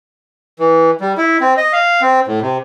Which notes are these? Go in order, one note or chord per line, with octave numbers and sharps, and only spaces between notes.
E3
G3
E4
C4
D#5
F5
C4
A2
C3